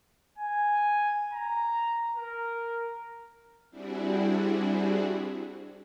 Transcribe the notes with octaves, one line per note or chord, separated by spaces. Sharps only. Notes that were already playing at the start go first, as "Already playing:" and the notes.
G#5
A#5
A#4
G3 C4 D4 E4 F#4 G#4